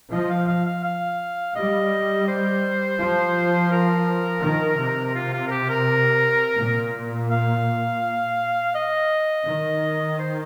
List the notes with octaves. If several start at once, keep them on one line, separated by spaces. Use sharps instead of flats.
F3 D#5
F5
F5
F5
F5
G3 D#5
C5
F3
A#4
D#3
C3
F4
F4
A#4
G4
A#4
A#2
F5
D#5
D#3
C5